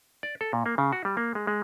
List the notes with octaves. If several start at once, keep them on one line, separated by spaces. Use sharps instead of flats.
D5
A4
A#2
A#3
C#3
F#4
G3
A#3
G#3
G#3